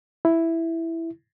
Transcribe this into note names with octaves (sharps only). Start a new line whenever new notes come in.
E4